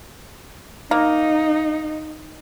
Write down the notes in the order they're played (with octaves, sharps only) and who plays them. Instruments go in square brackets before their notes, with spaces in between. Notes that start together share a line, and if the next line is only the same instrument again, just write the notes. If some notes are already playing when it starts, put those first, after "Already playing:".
[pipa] A#3 [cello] D#4